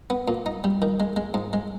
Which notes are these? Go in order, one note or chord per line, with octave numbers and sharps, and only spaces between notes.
B3
A#2
D#4
G3
D#3
G#3
G#3
G#2
G#3